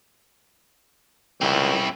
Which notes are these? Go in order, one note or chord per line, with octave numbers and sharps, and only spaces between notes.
C#2 C4 E4